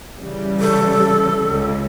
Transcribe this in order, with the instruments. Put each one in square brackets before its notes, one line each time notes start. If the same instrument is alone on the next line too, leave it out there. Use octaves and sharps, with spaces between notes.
[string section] C#3 E3 G3
[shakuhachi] A4
[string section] C#2 C#3